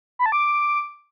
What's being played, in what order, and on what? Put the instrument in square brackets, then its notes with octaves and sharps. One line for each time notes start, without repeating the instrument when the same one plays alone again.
[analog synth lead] B5
A5
D6